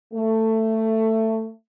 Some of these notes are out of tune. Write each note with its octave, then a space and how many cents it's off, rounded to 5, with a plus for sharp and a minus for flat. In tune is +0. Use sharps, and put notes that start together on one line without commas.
A3 +15